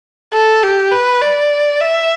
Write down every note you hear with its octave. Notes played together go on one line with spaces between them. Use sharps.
A4
G4
B4
D5
E5